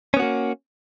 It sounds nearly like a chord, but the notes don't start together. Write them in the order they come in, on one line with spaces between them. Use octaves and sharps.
C#4 B3 F#4 A#3